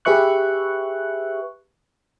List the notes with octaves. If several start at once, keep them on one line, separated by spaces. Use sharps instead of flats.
G4 G#4 B4 E5 C#6 F#6